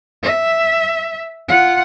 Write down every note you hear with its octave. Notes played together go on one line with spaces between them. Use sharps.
E5
F4 F#5